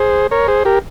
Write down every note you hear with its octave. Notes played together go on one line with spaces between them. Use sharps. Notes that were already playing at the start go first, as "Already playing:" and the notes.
Already playing: G#4 C5
A#4 C#5
G#4 C5
G4 A#4